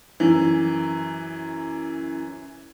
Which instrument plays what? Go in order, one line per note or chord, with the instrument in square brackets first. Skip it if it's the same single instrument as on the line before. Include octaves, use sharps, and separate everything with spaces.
[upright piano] F#2 E3